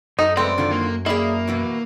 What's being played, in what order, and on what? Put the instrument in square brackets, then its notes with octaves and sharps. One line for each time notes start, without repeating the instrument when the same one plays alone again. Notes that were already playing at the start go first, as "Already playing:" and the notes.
[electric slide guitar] F#2 [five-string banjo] D#4 [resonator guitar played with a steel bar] A4
[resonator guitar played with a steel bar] G#3 A3 B4 [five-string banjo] C4 [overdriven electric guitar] D5
[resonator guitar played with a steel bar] D3 D#3 F4
[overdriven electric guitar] A#3
[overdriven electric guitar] A#3 [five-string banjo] E4 E5 [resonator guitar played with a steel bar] G#4 D5
[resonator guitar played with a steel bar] B2 E3 F#3